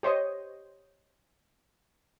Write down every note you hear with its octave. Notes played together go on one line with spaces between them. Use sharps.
G4 C5 C#5 D#5